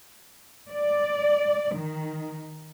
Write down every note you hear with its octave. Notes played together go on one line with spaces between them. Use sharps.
D5
D#3